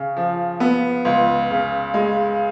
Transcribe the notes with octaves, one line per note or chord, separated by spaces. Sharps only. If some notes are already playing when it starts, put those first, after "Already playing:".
Already playing: C#3
F3
B3
C#2
C#3
G#3